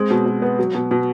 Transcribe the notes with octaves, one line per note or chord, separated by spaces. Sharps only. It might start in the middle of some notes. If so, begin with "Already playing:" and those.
Already playing: G#3 C4
B2
B2
B3
F#3
B2
B2